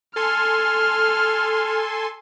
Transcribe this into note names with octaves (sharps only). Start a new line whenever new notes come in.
A4 G#5 C6 F6